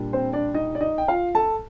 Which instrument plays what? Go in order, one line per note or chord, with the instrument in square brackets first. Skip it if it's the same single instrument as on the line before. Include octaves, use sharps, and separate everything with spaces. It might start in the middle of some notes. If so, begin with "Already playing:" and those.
Already playing: [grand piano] A#2 G3 D4
C4 C5
D4 D5
D#4 D#5
D5
D#4 D#5
G5
F4 F5
A4 A5